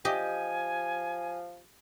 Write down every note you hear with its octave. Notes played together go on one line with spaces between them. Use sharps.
F3 G4 D#5 G#5